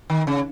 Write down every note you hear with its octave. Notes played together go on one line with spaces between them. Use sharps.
D#3
C#3